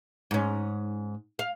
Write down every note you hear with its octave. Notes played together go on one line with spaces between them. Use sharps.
G#2 C#4
F5